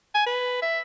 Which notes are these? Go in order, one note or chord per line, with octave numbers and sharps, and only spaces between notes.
G#5
B4
E5